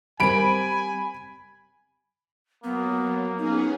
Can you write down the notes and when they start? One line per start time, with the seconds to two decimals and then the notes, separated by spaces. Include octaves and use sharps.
0.20 G3 C4 A#4 G#5 B5 D7
2.64 F#3 A#3 B3
3.38 B3 C#4 D#4 G#4